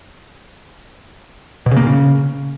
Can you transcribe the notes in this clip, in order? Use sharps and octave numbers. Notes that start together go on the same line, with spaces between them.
B2
C#3
A#3
A#2
C#3